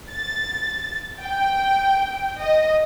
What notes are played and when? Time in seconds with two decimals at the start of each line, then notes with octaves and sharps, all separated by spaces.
0.12 A6
1.20 G5
2.42 D#5